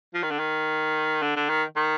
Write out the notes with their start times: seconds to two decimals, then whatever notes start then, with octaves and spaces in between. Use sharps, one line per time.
0.14 F3
0.23 D#3
0.31 D3
0.39 D#3
1.22 D3
1.36 D3
1.49 D#3
1.76 D#3